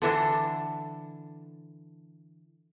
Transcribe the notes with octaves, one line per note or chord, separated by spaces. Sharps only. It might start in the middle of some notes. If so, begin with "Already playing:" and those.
D3 E3 D4 A4